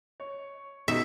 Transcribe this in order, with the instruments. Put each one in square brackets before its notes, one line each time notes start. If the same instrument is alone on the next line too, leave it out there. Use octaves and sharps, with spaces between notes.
[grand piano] C#5
[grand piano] B2 D#4 D#5 [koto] E5